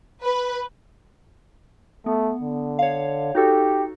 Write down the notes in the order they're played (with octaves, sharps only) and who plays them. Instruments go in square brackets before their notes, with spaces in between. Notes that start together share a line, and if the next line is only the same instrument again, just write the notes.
[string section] B4
[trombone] A3 [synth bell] B3
[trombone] D3
[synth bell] C#5 F5
[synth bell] D#4 F#4 A4 [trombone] G4